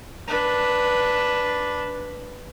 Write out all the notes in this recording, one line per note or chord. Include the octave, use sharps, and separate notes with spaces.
D4 B4